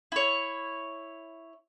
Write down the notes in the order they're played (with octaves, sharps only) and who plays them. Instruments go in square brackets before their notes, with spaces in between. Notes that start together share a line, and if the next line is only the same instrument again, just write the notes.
[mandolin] E4 C#5